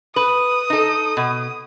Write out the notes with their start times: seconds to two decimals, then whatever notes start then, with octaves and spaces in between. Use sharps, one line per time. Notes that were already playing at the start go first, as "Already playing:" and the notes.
0.16 B4 D#6
0.70 D#4 A4
1.17 B2